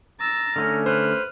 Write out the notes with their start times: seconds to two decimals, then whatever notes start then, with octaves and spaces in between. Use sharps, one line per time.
0.20 A#5 E6 A6
0.56 D3 A3 C#4 F6
0.86 B4 C5 F6